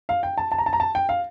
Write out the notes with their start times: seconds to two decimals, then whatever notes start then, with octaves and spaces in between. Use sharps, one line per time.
0.09 F5
0.23 G5
0.38 A5
0.52 A5
0.58 A#5
0.66 A5
0.73 A#5
0.80 A5
0.95 G5
1.09 F5